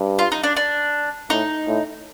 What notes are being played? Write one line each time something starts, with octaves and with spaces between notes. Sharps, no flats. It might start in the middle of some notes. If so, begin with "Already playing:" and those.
Already playing: G2
F4
D#4
D4
D4
A2 D#4
A2